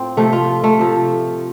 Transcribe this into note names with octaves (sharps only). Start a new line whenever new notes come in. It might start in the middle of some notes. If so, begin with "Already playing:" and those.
Already playing: A2 C4 F4
C3 F3 A3
F4
A3
C3 F3